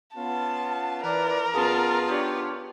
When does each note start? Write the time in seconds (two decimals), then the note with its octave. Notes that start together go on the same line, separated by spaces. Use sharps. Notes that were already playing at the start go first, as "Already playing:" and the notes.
0.16 B3 C#4 F4 A5
1.04 E3 A#4 B4 D5
1.54 F#2 B3 F4 G#4 A5
2.09 D4 G4 C#5